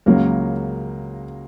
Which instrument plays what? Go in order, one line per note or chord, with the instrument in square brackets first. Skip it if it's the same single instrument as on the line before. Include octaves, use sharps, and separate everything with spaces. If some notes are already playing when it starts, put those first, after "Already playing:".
[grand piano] C#2 C#3 F#3 A#3 A#4